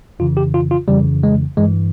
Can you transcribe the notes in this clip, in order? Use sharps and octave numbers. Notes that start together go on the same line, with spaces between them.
F2 C#3 E3 F4
G4
F4
F4
F2 C#3 E3 G3
G#3
G2 E3 G#3